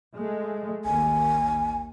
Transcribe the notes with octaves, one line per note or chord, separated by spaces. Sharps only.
G#3 A3
A1 D#2 G#5